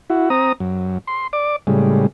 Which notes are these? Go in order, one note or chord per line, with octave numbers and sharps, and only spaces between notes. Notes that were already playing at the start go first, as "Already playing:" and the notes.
E4 F#4
C4 A#5 D#6
F#2
C6
D5 D6
A2 C#3 G3 G#3